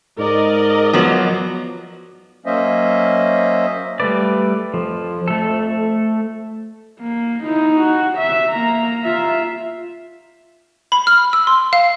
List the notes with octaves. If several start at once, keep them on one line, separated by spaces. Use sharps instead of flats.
G#2 A#4 D5 D#5
F3 F#3 B3
F#3 A#3 C#4 C5 D#5 E5
G3 A3 B4 D5
F2 F3
A3 A4
A#3
D#4 E4
F#4
E5
A#3 A#5
F4 E5
B5
F6
E6
C6
F5